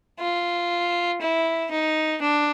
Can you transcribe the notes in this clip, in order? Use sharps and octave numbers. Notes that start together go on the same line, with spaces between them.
F4
E4
D#4
D4